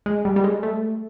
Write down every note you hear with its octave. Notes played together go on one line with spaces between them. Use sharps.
G#3
G3
G3
G#3
A3